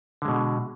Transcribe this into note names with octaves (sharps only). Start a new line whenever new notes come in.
B2 D3 G#3